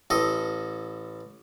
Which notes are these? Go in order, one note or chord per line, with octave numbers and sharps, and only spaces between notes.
A1 A4 D#5